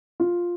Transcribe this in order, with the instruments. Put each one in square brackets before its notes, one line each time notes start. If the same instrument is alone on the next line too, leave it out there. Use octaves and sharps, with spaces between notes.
[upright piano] F4